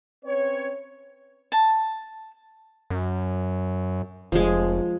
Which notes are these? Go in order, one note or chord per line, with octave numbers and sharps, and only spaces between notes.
C4 C#4 B4 C#5
A5
F#2
F1 F3 G#3